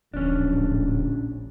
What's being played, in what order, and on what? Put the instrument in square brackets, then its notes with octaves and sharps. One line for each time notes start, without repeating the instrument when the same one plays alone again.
[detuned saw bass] D1 [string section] A#1 [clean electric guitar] C#4 D4